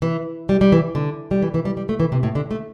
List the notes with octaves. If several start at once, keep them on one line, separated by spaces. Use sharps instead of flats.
E3
G3
G3
E3
D3
G3
E3
E3
G3
G3
A3
E3
C3
A2
D3
A3